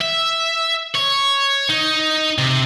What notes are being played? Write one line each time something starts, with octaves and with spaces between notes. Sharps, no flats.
E5
C#5
D#4
C3